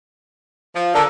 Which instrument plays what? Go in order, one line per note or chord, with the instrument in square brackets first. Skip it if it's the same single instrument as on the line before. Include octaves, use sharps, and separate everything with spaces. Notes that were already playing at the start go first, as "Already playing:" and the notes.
[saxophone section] F3
[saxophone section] D3 [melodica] D4 A4 A#4